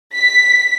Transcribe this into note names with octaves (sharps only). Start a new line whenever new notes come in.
B6